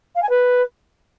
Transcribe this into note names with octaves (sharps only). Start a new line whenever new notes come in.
F5
G#5
B4